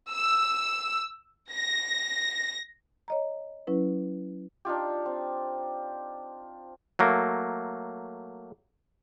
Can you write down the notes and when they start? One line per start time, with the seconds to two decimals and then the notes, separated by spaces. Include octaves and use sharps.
0.12 E6
1.52 A#6
3.08 C#5 D#5 A#5
3.67 F#3 C#4 E4 B4
4.65 D4 D#4 F4 G4
5.06 C4
6.99 F#3 A3 A#3